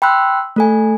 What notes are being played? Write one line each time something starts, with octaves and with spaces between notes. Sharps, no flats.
G5 B5 C6 E6 F#6
A3 A4 G#5